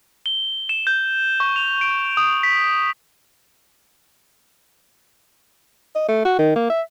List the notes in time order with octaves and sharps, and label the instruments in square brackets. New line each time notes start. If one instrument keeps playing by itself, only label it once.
[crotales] G7
E7
G6
C#6
F7
D7
D#6
B6
[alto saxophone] D#5
A3
F#4
D#3
A#3
E5